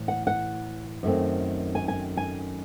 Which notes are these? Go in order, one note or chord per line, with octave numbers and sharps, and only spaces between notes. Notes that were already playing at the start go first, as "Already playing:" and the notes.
Already playing: A2 E3
F#5
F#5
F#2 D#3 A3 C4
G#5
G#5
G#5